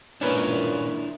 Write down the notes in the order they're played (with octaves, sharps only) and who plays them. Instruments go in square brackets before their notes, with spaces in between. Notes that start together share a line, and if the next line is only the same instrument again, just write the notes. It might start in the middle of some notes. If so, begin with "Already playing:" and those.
[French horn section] A#2 [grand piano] C#4 B4 [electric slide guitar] D4 E4 A#4